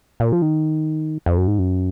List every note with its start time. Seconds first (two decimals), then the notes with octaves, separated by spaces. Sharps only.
0.20 A#2
0.32 F3
0.42 D#3
1.26 F2
1.37 F#2
1.47 G#2
1.59 F#2